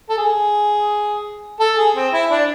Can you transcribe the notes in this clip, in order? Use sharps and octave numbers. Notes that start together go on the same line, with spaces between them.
A4
G#4
A4
G#4
C4
E4
D4